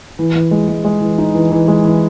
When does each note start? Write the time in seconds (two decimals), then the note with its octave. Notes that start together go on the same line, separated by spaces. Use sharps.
0.19 E3
0.35 E3
0.51 G#3
0.68 G#3
0.85 G#3
1.01 E3
1.18 D#4
1.35 E3
1.52 E3
1.68 G#3
1.84 E3